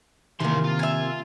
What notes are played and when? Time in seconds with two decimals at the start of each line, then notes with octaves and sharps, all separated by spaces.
0.40 C3 D#3 E3 A#3 C6
0.64 F4
0.79 E5 G#5